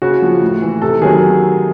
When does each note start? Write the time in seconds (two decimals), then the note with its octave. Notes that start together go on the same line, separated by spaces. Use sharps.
0.02 C#3 F#4
0.22 F3
0.42 A2
0.62 E3
0.82 C3 A4
1.02 D#3 F#3 G#4